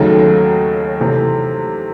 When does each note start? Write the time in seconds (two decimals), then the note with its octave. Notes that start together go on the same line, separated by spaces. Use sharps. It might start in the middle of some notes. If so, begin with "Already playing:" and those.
Already playing: D#2 C#3 F#3 A3 D#4
1.00 C3 E3 A3